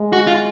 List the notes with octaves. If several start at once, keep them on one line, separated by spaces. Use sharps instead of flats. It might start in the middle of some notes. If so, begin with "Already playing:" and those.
Already playing: G#3
F#4
F4